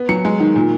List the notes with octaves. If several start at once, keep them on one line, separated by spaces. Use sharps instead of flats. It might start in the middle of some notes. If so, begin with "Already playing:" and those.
Already playing: B3
F#3 C#7
G#3
D#3
A#2